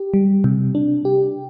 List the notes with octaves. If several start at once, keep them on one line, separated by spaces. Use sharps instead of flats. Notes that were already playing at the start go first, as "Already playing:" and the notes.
Already playing: G4
G3
C3
D4
G4